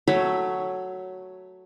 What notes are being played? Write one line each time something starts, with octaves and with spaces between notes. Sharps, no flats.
F#3 A3 C#5 B5